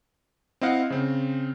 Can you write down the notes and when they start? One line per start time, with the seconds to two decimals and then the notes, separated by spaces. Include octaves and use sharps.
0.61 C4 E4 D#5 F5 F#5
0.90 C#3 C4